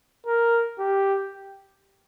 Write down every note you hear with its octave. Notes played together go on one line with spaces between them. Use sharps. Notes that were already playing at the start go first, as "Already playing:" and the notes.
A#4
G4